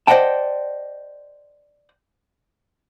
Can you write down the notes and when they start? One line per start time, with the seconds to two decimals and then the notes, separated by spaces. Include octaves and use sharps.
0.07 C5 D5 D#5 F#5 G5 A5